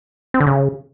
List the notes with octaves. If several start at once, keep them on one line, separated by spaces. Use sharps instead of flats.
C4
D3
C#3